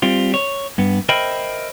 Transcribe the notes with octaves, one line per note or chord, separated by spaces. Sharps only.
G3 C4 F4
C#5
G2 B3
A#4 C5 D#5 E5 G5 B5